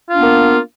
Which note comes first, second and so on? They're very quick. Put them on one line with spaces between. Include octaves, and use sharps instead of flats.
F4 D4 B3 A#3